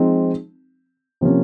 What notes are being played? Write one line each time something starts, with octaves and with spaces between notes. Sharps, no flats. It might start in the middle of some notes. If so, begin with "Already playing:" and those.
Already playing: F3 G#3 C4 D#4
C3 F3 A#3 C#4